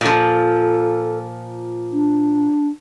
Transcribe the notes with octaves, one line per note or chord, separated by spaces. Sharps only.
A#2 F3 A4
D4